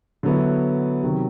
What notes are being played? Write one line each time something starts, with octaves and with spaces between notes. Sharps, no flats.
D3 F#3 B3 E4
C3 D#3 F#3